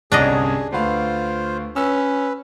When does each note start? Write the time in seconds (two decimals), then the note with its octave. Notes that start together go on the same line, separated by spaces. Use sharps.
0.12 G1 C2 C#4 D4 G#4 D5 D#5
0.72 D2 F4 B4 C5 F5
1.76 C#4 B4 E6